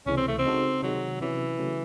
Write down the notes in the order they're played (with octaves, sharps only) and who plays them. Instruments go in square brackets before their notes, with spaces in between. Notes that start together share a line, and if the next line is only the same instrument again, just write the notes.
[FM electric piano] C#2 C3 E3 G#3 [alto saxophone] C#4
[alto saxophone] C4
A3
C4
[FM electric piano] C#3 G#3 D#4 F#4 A4
[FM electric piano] C3 D#3 G#3 [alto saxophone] F#3
[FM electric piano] C3 F#3 C#4 [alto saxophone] E3
[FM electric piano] C#3 F#3 A3